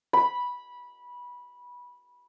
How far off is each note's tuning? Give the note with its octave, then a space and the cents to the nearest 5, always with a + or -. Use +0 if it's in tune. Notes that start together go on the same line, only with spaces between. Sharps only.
B5 -15